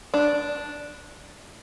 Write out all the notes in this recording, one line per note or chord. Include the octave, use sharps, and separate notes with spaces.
D4